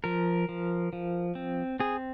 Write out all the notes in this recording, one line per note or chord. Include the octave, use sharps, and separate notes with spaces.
F3 A#4
F3
F3
C4
C4 G#4